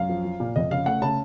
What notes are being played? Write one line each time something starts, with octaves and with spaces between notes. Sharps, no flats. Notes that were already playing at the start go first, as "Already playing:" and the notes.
Already playing: F#2 F5
F3
F3
A#2
F2 D#5
C#3 F5
A3 F#5
C#3 A5